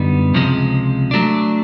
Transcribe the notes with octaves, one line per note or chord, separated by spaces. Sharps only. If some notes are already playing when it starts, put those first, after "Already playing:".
Already playing: F#2 D3 G3 B3 D#4
C#2 C3 F3 G#3
F#3 A3 D4